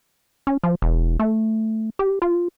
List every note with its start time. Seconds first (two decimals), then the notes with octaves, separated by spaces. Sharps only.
0.47 C#4
0.63 F3
0.82 E1
1.19 A3
1.99 G4
2.22 F4